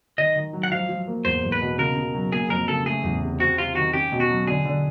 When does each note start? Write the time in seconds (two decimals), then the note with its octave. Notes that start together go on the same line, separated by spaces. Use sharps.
0.18 D#3 D#5
0.36 D#3
0.53 F#3
0.63 F#5
0.72 F3 F5
0.89 F3
1.08 A#3
1.25 E2 C5
1.43 E2
1.52 B4
1.61 B2
1.79 C#3 A#4
1.96 C#3
2.14 F#3
2.32 A#3 G#4
2.50 F2 A#4
2.68 C#3 A4
2.86 A3 G#4
3.04 E2
3.22 C3
3.39 C4 F#4
3.58 C3 F4
3.75 D#3 F#4
3.93 C#4 G4
4.12 B2
4.20 F#4
4.30 F#3
4.47 D3 G#4
4.65 D3